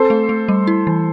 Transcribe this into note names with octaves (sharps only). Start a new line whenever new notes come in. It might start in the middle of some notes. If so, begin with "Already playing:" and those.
Already playing: C4 A4 C5
A3
A3
G3
E4
E3